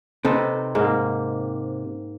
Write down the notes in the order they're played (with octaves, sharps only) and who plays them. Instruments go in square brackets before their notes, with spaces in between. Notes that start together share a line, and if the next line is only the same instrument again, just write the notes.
[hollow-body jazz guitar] C3 [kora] D#4 A4 B4
[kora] G#2 A#3